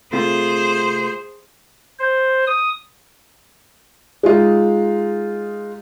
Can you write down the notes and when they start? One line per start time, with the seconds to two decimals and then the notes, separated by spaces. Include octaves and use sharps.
0.13 C3 A3 F4 G#4 C5
1.99 C5
2.47 D#6
4.23 G#3 D#4 F4